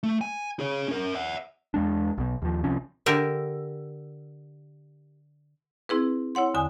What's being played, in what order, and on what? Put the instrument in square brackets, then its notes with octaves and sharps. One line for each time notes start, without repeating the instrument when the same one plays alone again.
[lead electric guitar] A3
G#5
G#4 C#5
C#4 A#4
E5 F#5
[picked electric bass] E2 G#3 D4
B1 B2
D#2 F3
C2 C3 F3 C#4
[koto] D3 G4 A#4 E5
[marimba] C4 E4 G#4 B4
E4 C#5 F#5 C6
E2 D3 G#5 D#6